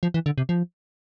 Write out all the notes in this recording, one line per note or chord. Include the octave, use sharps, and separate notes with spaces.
F3
E3
D3
C3
F3